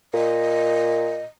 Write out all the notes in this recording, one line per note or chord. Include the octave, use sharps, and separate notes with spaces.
A#2 D#5